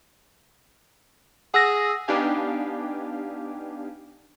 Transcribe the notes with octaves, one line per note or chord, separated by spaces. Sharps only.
G#4 F#5 E6 A#6
B3 D4 D#4 G4 F5 G#5